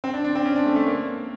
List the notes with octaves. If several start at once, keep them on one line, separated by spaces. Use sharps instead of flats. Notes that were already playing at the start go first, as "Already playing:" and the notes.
C4
D4
D4
C4
C#4
D4
A3
A3
A#3